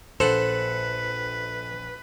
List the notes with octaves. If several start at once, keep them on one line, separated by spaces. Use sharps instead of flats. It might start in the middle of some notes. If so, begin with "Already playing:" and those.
A#1 A4 B4 C5 F#5